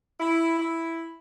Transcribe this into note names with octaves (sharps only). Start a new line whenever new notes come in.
E4
E4